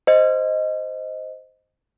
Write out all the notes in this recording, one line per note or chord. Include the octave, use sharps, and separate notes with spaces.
C5 D#5